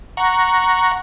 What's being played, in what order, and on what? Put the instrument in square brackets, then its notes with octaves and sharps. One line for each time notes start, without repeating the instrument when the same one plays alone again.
[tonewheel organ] F#5 A#5 C#6